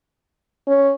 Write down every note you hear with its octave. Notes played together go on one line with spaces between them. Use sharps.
C#4